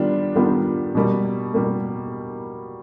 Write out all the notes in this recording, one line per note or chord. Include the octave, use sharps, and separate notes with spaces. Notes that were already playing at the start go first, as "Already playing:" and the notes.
Already playing: D#3 G3 B3 D4 F4
D#3 G3 B3 D4 F4
B2 G3 A#3
B2 G3 A#3